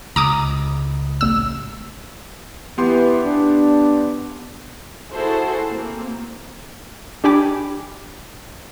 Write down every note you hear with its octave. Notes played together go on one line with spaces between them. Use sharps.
C#2 A#5 D6 D#6
A1 E6
E3 B3 G4 C6
D4
E4 F#4 G#4 A4 C5
A#3 C4
D4 G4 G5 G#5 B5 D6